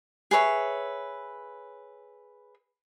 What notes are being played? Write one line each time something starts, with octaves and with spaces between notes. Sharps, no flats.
G#4 B4 C#5 E5